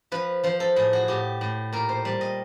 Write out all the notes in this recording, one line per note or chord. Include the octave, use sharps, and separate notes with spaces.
F3 B4
F3 C5
A4
A2 G#4
F#4
A2 G4
A2
A#2 A#4
C5
G3
D#5